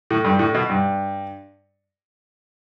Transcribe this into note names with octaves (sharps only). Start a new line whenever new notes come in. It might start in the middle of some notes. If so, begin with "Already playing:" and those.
A2
G2
A2
B2
G2